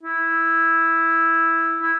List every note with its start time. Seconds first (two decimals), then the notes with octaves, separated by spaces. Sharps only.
0.03 E4
1.82 E4